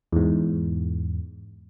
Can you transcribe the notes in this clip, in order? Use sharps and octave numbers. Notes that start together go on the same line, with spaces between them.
E2 G#2